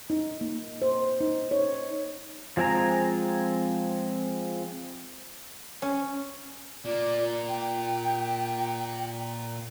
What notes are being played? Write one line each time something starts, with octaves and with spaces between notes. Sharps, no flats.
D#4
A#3
C5
D#4
C#5
F3 G#3 C4 G#5 A#5
C#4
A#2 A#3 D5
G5